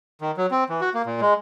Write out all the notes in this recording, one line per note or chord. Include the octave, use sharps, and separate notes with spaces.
D#3
F#3
C4
E3
F#4
A#3
A#2
G#3